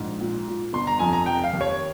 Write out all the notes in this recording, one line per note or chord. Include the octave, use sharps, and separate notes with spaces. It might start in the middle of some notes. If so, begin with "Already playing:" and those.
Already playing: A#1 G#2
A#2
A#2
G1 C6
A#5
F2 G#5
A#5
F1 G5
F5
D#2
C#5